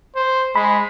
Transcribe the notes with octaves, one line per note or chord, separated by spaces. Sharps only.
C5
G#3 B5